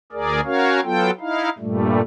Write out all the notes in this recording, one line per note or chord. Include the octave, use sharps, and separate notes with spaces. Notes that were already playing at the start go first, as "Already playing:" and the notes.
D2 G#4 A#4 D5
C#4 F#4 A#4 C#5 F5
F#3 B3 F4 A4 G5
D#4 E4 F5
G2 A#2 G3 A3